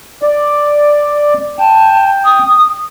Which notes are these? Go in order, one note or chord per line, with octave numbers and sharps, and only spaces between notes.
D5
G5 A5
D#6